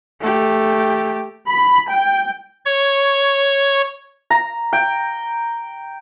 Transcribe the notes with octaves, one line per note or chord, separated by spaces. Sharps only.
A3 G4
B5
G5
C#5 C#6
A#5
G5